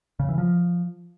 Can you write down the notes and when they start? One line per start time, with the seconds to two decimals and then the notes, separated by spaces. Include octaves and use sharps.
0.20 C#3
0.29 E3
0.38 F3